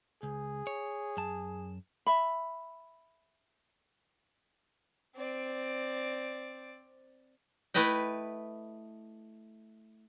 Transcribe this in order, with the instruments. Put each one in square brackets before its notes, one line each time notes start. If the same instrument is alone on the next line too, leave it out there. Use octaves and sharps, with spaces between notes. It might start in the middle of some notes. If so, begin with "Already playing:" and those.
[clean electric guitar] C#2 [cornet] G#4
[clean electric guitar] C#5
F#2 A5
[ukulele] E5 B5
[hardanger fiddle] C4 D5
[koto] A3 E4 B4 D#5 G5